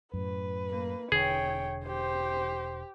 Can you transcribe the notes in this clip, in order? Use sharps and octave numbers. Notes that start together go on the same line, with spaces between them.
F#2 A2 B4
A#3
E1 D3 G#4 C#5 G5
G4 C5